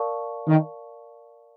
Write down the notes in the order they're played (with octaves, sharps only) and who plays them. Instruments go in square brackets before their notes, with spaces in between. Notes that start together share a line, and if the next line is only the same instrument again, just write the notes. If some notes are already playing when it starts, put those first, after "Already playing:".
Already playing: [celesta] A#4 D5 F5 A5 C#6
[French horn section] D#3